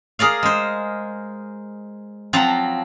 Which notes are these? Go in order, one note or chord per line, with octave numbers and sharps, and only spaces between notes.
G#4 A#4 D5 F5
G#3 C5
F3 F#3 C4 A5 A#5